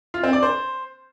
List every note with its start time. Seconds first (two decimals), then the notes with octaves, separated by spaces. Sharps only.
0.14 F4
0.23 C4
0.33 D5
0.43 C5